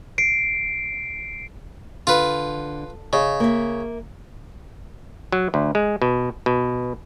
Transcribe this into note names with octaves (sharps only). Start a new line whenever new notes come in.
C7 D7
D3 F4 B4
C#3 D#5
A#3 E5
F#3
D2
G#3
B2
B2